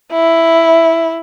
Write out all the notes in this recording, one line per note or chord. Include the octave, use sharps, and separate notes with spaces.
E4